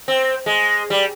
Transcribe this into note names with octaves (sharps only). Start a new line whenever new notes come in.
C4
G#3
G3